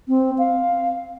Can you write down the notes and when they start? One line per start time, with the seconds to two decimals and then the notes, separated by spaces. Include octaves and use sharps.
0.09 C4
0.39 F5